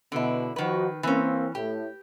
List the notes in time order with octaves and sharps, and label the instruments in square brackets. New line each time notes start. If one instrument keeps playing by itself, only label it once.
[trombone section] B2 [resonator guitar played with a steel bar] D3 E4
[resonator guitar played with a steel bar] D#3 B4 [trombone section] F3 D#4 F#4
[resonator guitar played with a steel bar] E3 C#4 [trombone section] A#3 C4
[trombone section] A2 [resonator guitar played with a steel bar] G4